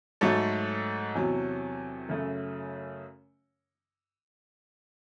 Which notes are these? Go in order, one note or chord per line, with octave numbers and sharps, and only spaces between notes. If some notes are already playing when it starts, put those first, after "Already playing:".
G#2 F#3 A3 A4 C#5
E2 C3 F#3
F#2 C#3 F#3 A3